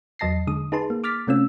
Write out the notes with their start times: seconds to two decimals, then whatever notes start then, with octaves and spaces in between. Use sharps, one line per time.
0.19 E2 F#3 D#5 A5 A#6 C7
0.47 D3 G#3 D#6
0.72 D#4 G#4 B4 A5 C6
0.90 A#3
1.04 D6 F6 A6 B6
1.27 C3 A3 C4 C#4 F4 E6